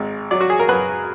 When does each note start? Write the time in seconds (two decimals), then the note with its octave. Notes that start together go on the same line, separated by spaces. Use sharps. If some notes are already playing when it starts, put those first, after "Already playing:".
Already playing: G#1 G#2
0.31 F#3 D5
0.41 F#4
0.50 G#4
0.59 A#4
0.69 F#2 B4